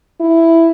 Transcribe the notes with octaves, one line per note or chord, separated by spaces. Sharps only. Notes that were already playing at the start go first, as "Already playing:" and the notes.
E4